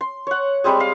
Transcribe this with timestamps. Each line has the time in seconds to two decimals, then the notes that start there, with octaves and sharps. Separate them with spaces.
0.01 C6
0.27 C#5 F#5
0.64 G3 G#3 C4 G#4
0.80 F5